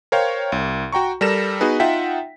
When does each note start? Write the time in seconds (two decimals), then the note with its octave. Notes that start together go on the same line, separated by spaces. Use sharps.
0.12 A#4 C5 C#5 F5 G5
0.52 C2
0.92 F#4 G5 A#5 C#6
1.21 G3 A4 A#4 A#6 E7
1.61 B3 D#4 F#4 G#4 B4
1.80 D#4 F4 E5 F#5 G5 B6